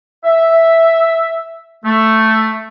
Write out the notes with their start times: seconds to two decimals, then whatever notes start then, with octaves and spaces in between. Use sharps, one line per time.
0.25 E5
1.85 A3